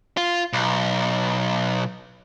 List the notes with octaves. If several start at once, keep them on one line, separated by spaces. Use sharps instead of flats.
F4
B1